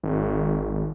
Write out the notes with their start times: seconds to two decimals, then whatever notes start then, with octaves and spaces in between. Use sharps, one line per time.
0.04 G#1